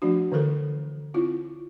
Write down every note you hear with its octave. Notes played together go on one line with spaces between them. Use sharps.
F3 A3 D4 F#4
D3 E3 A4 A#4
C4 E4 F4